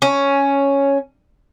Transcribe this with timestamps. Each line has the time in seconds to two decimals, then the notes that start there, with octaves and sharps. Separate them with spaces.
0.02 C#4